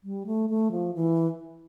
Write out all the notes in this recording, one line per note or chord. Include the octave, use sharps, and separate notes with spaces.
G3
A3
A3
F3
E3